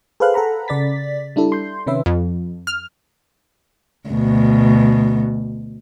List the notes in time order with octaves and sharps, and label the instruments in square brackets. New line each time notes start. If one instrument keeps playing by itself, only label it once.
[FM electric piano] G#4 A4 B4 C5 F5 F#6
A4 F#5 A#5 B5
C#3 D5 A6 B6
G3 D4 E4 A4
C6 G6
C3 D#3 C#4 B4 E5
[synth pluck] F2
F6
[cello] D2 B2